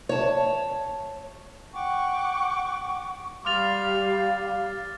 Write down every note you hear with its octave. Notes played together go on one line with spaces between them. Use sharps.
C#5 A5
F#5 G5 C#6 D6
G3 F5 C6 D6 F6 A6 F7